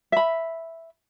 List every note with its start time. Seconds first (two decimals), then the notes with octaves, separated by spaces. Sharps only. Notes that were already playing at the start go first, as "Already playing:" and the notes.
0.12 E5 B5